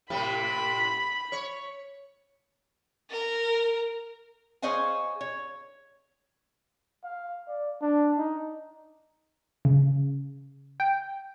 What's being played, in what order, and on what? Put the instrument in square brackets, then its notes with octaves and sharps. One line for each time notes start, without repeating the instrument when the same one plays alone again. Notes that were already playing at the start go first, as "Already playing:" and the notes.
[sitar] A2 C3 G4 [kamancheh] B5
[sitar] C#5
[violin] A#4
[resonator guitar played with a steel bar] G#4 C5 C#5 D#5 F5 G#5
C#5
[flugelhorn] F5
D5
D4
D#4
[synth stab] C#3
G5